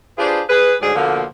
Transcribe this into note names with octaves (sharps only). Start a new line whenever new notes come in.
D4 F4 G4 G#4 B4 C5
G#4 B4
D2 G#2 F#3 G#4 D5
B2 D3 F3 A#3